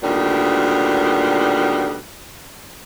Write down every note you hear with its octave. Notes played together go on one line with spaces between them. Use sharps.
D2 A#2 D#3 G3 B3